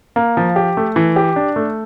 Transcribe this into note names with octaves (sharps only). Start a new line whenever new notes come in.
A#3
F3
G4
A3
E3
G4
D4
A3